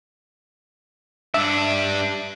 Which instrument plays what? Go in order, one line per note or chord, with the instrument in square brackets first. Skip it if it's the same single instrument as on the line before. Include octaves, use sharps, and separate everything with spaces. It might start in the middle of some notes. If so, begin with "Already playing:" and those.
[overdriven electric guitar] G2 D4 [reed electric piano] E5